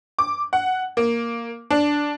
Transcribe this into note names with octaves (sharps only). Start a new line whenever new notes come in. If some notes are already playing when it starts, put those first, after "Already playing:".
D6
F#5
A#3
D4